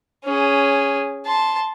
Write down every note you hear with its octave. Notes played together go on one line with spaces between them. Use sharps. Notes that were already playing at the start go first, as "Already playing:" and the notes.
C#4 G#4
A5 C6